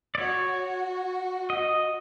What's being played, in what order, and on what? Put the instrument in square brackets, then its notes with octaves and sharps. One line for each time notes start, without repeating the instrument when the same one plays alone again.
[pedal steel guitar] D5
[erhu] F#4 [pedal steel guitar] C#5
[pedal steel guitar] D#5